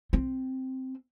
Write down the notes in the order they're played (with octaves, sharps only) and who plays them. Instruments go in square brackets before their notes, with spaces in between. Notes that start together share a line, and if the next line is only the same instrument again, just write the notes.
[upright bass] C4